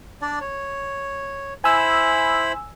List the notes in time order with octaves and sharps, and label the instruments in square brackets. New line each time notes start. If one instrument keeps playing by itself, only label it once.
[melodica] D4 D5
C#5
[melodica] E4 C5 B5 [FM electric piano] G#5 E6